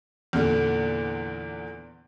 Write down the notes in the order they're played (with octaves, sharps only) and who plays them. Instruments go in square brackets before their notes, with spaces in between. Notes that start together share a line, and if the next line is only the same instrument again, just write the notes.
[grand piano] E2 A#2 D3